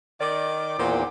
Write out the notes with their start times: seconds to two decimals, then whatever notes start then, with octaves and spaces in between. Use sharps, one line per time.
0.20 D#3 D5 D6
0.78 E2 A#2 D#3 B3 C4